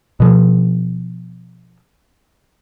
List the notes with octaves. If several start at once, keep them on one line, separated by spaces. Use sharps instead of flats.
B2 F3